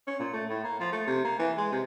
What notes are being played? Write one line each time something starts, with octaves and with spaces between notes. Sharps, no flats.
C#4
A#2
A3
A2
A#3
F3
A3
C3
A#3
E3
G#3
C3